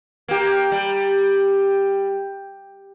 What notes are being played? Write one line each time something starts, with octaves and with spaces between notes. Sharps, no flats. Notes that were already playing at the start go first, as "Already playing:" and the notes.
A#3 G4
G3